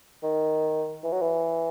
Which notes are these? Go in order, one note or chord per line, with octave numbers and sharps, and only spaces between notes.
D#3
E3
F#3
E3